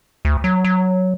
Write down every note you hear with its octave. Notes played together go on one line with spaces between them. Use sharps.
D2
F#3
F#3